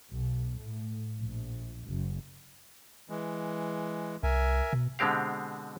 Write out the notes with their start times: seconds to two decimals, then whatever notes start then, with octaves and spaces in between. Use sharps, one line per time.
0.12 B1
0.59 A2
1.20 A#1
1.87 F#1
3.10 E3 G#3
4.23 C2 A#4 E5 G#5
4.73 B2
4.99 B2 D3 G#3 C4 G4 F5